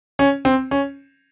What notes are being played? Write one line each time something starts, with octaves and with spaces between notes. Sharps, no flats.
C#4
C4
C#4